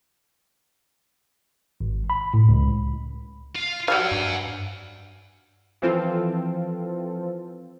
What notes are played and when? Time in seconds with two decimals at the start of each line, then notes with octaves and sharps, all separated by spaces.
1.81 G#1
2.10 B5
2.34 A2
2.49 C#2
3.56 F4
3.88 F#3 G3 F5 F#5 G#5
4.11 G2
5.82 E3 F3 C4 F4 A4